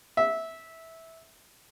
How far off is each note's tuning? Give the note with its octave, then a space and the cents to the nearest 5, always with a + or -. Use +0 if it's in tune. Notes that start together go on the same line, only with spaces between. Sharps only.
E5 -15